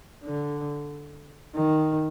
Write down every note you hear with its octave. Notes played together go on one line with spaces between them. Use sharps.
D3
D#3